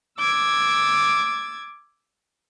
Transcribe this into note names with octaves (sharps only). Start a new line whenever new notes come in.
D6 E6 G#6 A6